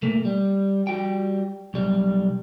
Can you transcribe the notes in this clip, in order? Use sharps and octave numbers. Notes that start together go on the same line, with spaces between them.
B2 A3 A#3
G3
G3 F#4 G5
B1 G3